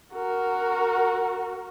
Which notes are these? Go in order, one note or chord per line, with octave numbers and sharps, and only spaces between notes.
F#4 A#4